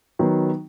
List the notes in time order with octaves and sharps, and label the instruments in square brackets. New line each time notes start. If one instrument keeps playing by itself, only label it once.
[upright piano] D#3 F#3 B3